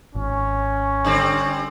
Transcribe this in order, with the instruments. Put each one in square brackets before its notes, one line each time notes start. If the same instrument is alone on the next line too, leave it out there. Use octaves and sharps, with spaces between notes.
[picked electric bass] G#1 [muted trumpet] C#4
[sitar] D3 G3 C4